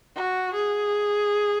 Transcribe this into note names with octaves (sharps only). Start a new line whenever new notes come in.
F#4
G#4